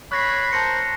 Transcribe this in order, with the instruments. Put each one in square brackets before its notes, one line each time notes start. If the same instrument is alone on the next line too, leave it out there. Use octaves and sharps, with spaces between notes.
[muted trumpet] C#5 [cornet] B5 [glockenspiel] F#6 A#6 C7
[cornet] A#4 [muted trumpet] C5 [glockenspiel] A5 A#6 C#7